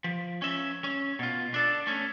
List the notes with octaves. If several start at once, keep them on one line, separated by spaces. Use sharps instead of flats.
F3
C#4 E5
C#4
B2 F4
D4 A4
A3 C#4